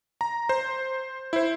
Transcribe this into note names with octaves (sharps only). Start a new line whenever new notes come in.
A#5
C5
E4 C5